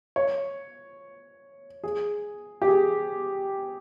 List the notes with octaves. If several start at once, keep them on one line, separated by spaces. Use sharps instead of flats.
C#5
G#4
G4
G#4